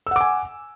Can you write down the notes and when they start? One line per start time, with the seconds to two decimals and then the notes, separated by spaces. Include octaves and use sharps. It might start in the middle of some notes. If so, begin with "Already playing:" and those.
0.07 E6
0.11 F#5
0.16 D6
0.21 G#5